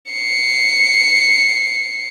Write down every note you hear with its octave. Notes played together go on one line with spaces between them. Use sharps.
C7 C#7